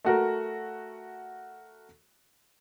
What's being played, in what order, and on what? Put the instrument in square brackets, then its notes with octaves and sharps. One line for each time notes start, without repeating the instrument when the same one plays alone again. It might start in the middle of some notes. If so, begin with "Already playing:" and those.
[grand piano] A3 F#4 A#4